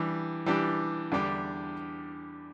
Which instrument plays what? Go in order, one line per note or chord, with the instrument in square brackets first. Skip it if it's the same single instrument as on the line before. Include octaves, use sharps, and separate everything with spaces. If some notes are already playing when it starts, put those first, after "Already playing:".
Already playing: [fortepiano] E3 G3 D4 G4
E3 G3 D4 G4
E2 D3 G3 D4 G4